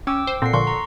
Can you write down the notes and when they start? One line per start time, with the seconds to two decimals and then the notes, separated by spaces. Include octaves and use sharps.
0.07 C#4 G5 D6 E6
0.27 C5
0.42 A#2 C4 A4 F#5 C7
0.53 A#2 D3 F3 C6 C#6
0.67 A#5 C#6